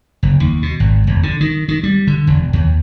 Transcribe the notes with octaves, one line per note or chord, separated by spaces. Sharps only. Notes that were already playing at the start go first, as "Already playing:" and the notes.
F#1
D#2
B2
G#1
E1
D3
D#3
D#3
G3
D3
E1
D#2